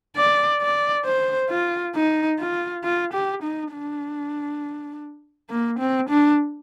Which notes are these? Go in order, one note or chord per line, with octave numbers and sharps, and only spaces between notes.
D5
D5
C5
F4
D#4
F4
F4
G4
D#4
D4
A#3
C4
D4